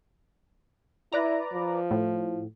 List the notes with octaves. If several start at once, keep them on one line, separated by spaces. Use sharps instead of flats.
E4 B4 D5 A#5
F3
A2